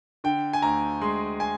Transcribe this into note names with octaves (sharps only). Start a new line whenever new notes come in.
D3 G5
G#5
D2 A#5
G#3 C6
G#5